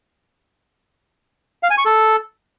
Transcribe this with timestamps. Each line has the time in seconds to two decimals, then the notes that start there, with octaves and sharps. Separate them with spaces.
1.63 F5
1.70 G#5
1.78 C#6
1.85 A4